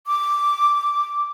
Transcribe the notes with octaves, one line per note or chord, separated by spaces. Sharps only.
D6